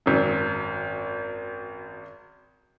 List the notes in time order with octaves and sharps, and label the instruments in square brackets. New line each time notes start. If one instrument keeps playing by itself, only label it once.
[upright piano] G#1 F#2